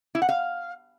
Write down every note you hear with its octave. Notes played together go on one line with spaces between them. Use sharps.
E4
F#5
F5